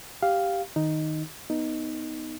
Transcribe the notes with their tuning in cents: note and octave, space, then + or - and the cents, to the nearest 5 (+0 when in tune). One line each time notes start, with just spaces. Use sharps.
G4 +0 F5 +0
D#3 +0 D#4 +0
B3 +0 D#4 +0